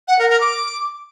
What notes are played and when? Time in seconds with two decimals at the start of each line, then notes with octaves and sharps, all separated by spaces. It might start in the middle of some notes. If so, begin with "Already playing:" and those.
0.08 F#5
0.19 A#4
0.30 A#4
0.40 D6